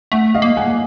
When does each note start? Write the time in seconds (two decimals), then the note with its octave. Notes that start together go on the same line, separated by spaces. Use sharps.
0.12 A3 E5 F#5
0.34 D#5 F5
0.42 A#3
0.57 F#5 G#5